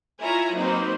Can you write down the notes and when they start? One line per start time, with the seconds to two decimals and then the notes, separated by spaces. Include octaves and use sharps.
0.23 E4 F4 C#5 E5 G#5 A#5
0.55 F#3 A#3 C4 D#4 B4 C5